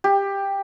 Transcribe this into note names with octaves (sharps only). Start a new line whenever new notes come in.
G4